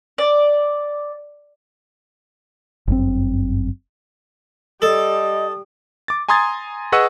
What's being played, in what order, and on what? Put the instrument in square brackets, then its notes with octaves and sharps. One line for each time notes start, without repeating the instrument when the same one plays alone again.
[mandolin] D5
[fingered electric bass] G1 F#2 C4
[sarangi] G3 [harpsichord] A4 [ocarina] D#5 [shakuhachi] D#6
[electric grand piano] D6 A6
G#5 A#5 C6 D#6 G#6 A6
G#4 B4 D#5 F#5 C#6 E6